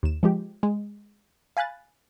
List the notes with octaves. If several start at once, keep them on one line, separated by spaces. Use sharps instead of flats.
D#2 E7
F3 G#3 G4
G#3
F5 G#5 B5 F#6 A6